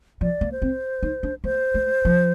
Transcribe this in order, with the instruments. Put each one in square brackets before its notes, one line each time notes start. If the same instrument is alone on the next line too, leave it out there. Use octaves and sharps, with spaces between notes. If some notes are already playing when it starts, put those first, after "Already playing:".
[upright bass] F3 [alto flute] D5
[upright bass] A#3
[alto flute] C5
[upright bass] C4
D#4
D4
[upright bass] A#3 [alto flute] C5
[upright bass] A3
F3